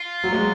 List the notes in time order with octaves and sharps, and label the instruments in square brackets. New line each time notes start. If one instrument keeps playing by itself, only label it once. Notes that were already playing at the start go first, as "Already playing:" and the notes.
Already playing: [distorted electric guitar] F4
[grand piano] F#3
G#3